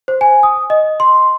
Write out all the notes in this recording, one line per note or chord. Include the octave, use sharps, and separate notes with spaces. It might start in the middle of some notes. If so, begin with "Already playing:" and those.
C5
G#5
D#6
D#5
C6